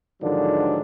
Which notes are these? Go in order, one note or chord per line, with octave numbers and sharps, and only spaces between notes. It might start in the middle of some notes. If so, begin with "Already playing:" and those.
G#2 D3 D#3 F3 F#3 D4